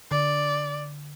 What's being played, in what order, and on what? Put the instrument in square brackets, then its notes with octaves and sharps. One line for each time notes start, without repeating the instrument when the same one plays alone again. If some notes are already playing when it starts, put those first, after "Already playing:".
[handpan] D3 [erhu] D5